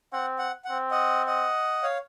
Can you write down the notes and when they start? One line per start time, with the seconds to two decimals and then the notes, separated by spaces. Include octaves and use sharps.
0.13 C4 F#5
0.39 F#5
0.65 C4 F#5
0.91 D#5 F#5
1.26 D#5 F#5
1.83 C#5 F5